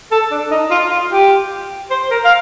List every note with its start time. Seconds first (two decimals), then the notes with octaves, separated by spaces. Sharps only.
0.11 A4
0.31 D4
0.51 D#4
0.71 F4
0.91 F4
1.11 G4
1.91 C5
2.11 A#4
2.25 F5